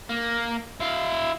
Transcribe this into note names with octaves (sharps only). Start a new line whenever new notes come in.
A#3
E4 F5